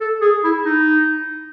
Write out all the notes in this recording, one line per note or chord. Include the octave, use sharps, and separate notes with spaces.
A4
G#4
E4
D#4